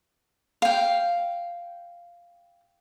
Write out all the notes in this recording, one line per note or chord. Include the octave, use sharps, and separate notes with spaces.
F5 G5